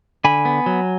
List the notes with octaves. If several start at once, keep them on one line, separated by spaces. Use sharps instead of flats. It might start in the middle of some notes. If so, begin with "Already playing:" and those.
D3 G#5 B5
B3
F#3